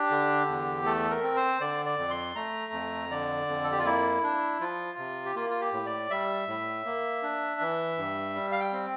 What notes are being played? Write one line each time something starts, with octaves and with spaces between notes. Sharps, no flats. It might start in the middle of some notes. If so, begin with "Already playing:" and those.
Already playing: D4 G4
D3
E2
A3 A4
A#4
C4
C5
D3 D5
D5
F2
C6
A3 A#5
F2
D3 D5
F2
A4
G4
F4
A#3 E4
D4
F3 F4
C3
G4
A#3 F4
F4
G4
A2
D5
G3 E5
A2
A#3
D4
E3
G2
G3
F5
G5
C4